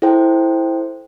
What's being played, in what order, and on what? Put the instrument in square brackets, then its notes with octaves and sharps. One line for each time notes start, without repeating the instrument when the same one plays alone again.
[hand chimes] E4 A4 C5 G5